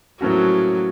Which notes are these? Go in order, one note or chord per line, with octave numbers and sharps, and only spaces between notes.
A2 F3 F#3 A#3 C#4 F#4